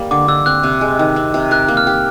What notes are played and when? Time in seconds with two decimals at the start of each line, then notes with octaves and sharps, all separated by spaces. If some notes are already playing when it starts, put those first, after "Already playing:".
Already playing: G3 A#3
0.11 D3 D6
0.28 D3 E6
0.46 C4 F#6
0.63 C3
0.81 G#3
0.99 D#3
1.16 C4
1.34 C3
1.51 A#4 F#6
1.68 A#3
1.77 F6
1.87 G4